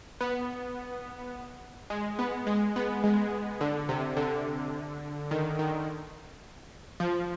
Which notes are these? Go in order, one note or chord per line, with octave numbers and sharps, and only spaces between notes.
B3
G#3
B3
G#3
B3
G#3
D3
C3
D3
D#3
D#3
F3